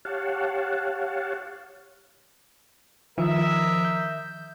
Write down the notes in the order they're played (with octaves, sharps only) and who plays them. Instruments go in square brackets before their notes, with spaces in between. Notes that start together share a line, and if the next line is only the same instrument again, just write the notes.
[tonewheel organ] G4 C#5 F5 F#5 A5
[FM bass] D#3 [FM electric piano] F3 [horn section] A#4 D#5 E5
[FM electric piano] G6